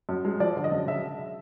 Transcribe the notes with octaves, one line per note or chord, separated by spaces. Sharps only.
F#2
G#3
F3 D5
D3
D#5
F#2
C#3 E5